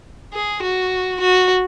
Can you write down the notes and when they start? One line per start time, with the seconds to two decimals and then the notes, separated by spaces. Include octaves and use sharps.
0.33 G#4
0.63 F#4
1.20 F#4